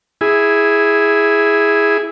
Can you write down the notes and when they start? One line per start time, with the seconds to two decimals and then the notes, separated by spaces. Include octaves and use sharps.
0.21 E4 G#4